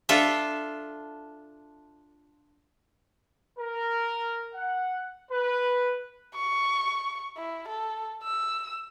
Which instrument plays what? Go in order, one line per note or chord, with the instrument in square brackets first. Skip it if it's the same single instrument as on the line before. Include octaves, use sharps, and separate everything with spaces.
[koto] D4 F4 A4 E5
[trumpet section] A#4
F#5
B4
[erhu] C#6
E4
A4
E6